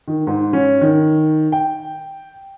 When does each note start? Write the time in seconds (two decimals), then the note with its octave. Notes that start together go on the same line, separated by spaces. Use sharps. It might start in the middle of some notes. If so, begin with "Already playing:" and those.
0.08 D#3
0.27 G#2
0.53 C#4
0.81 D#3
1.52 G5